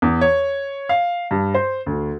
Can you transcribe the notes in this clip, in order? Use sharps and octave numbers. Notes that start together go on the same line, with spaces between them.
E2
C#5
F5
G2
C5
D2